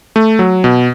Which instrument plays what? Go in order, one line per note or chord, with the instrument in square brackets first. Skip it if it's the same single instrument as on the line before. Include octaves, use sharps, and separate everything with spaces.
[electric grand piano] A3
F#3
B2